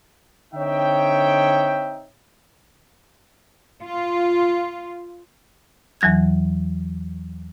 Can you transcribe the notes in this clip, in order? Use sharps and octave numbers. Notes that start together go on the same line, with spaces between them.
D3 C4 D#4 C#5 E5 G5
F4
E2 E3 F#3 F#6 G#6